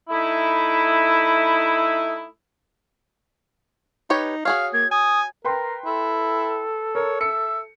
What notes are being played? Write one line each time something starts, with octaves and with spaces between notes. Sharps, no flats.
A3 D#4 E4
D#4 G4 B4 C#5
F#4 G#4 C#5 F5
A#3 G#6
G#5 D#6
A#4 B4 G5 C6
E4 A4
A#4 C#5
E5 C#7